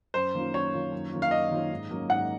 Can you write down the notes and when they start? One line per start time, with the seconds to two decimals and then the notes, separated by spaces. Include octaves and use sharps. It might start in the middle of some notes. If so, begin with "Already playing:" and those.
0.14 F#2 C5
0.35 D#3 A#3 C#4 F4
0.54 F#2 C#5
0.73 D#3 A#3 C#4 F4
0.92 F#2
1.12 D#3 A#3 C#4 F4
1.22 F5
1.31 F#2 D#5
1.51 D#3 A#3 C#4 F4
1.70 G#2
1.90 F#3 A#3 C#4
2.09 G#2 F#5